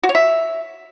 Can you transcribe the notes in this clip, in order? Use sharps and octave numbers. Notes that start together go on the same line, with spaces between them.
F#4
C#5
E5